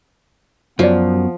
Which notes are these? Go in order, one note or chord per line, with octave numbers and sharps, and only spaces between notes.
F#2 F3 B3 F#4 C#5 D5